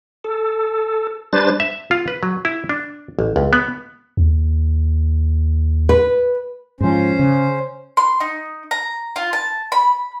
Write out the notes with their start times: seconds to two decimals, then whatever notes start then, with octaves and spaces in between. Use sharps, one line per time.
0.24 A4
1.33 G3 D4 B4 C5 A6
1.60 E5
1.91 F4
2.08 B4
2.23 F#3
2.45 E4
2.69 D4
3.19 A1
3.36 C#2
3.53 B3
4.17 D#2
5.89 B4
6.81 G#2 F3 C#4 C5
7.19 C#3
7.97 C6
8.20 D#4
8.71 A#5
9.16 F4
9.33 A5
9.72 B5